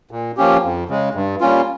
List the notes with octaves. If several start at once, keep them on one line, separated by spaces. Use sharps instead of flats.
A#2
F3 A#3 C#4 G4
F2
C#3 G#3
G2
G3 A#3 C#4 F4